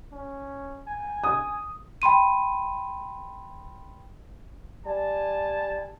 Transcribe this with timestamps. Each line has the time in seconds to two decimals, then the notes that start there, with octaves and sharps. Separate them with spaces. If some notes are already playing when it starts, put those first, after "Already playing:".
0.12 C#4
0.87 G#5
1.24 D#6
2.02 G5 B5 C6 D#7
4.86 G3 G#5 A5